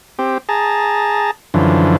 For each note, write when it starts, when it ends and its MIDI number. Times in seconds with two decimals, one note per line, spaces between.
0.19 0.38 60
0.19 0.38 67
0.49 1.31 68
0.49 1.31 81
0.49 1.31 82
1.54 1.97 42
1.54 1.97 50
1.54 1.97 52
1.54 1.97 53